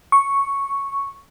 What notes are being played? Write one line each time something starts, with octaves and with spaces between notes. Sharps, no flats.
C#6